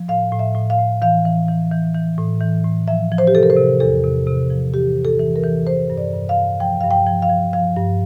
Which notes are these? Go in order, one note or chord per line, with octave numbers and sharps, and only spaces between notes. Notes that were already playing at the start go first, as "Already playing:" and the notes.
Already playing: F3
A2 F5
A2
E5
A2
F5
A2
E3 F5
E3
E3
E3
E3
A2
E3
A2
F3 E5
F3
C5
G4
C3 A4
A#4
C5
C3
E2 A4
C3
C3
F3
E3 G4
G2
A4
E3
A#4
E3
E3 C5
G2
D5
G2
F5
G2
F3 G5
G2 F5
G5
F3
F5
F3
F3 F5
G2